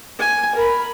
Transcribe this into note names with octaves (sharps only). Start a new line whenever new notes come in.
G#5
A#4 B5